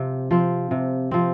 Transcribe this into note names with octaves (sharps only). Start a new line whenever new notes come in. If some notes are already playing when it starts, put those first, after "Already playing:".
Already playing: C3 F3 C4
F3 C4
C3
F3 C4